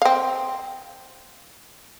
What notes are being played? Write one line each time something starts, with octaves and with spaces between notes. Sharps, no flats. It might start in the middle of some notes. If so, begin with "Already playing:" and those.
C4 F5